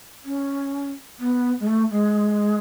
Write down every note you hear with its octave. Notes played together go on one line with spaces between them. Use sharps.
C#4
B3
G#3
A3
G#3